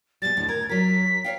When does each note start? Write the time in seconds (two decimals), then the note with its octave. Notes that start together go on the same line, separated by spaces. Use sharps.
0.22 B2 G3 A6
0.37 D#2 A2 D3
0.48 A#4 G#6
0.69 F#3 A#4 B6
1.24 C#5 D#5 F5 G5